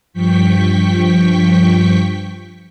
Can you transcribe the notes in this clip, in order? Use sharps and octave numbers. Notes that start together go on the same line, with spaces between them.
G2 F3 G5 C#6 B6